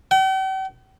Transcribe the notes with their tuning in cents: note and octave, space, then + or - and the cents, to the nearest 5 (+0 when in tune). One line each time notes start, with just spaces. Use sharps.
G5 -45